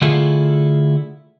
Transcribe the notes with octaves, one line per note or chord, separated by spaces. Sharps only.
D3 A3 E4 F4 G#4 A4